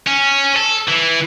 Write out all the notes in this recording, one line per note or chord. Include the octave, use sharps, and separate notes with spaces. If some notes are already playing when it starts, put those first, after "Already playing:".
C#4
A4
E3